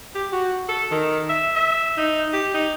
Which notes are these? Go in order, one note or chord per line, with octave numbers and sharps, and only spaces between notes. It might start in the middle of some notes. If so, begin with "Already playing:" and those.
G4
F#4
A4
D#3
E5
E5
D#4
G4
D#4